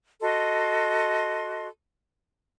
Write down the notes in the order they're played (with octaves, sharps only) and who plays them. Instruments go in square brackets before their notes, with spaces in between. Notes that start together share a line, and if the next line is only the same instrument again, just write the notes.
[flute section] F#4 A4 D#5 C6